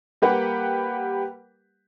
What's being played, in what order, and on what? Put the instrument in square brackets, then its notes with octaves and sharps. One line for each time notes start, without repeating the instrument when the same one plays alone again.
[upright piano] G3 A#3 G4 B4 F#5